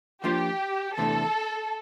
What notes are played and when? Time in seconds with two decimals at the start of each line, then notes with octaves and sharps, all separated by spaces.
0.24 F3 A#3 D4 F4 G4 C5
0.96 E2 C3 E3 A3 D4 A4